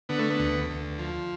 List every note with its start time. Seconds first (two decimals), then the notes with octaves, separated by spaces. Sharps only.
0.09 D3 B3
0.19 A3
0.30 B3
0.39 D2
0.70 D2
0.99 F3